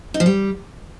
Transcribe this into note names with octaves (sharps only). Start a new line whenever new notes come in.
D#4
F3
G3